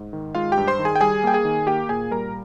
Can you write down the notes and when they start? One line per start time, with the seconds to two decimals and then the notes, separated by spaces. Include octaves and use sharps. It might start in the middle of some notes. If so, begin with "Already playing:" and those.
Already playing: G#2
0.13 D#3
0.35 G#3 F4 F5
0.52 G4 G5
0.57 G2
0.67 C5 C6
0.79 D#3
0.85 G#4 G#5
0.96 G5
1.01 G3 G#4 G#5
1.24 A#3 G5
1.34 G#4 G#5
1.45 D#3
1.67 A#3 G4 G5
1.89 A#2 G#4 G#5
2.11 G3 A#4 A#5